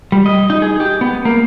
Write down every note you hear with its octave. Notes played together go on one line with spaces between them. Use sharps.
G3
D#5
D#4
G#4
G4
B3
A#3